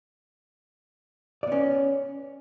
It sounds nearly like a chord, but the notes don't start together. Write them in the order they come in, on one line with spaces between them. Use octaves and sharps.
D5 B3 C#4